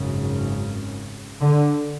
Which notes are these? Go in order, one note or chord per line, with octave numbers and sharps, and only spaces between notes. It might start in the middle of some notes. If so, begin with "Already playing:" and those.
Already playing: G#1 F#2 C#3
D3